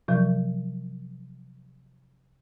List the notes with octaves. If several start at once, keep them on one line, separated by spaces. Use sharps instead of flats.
C3 F3 F#3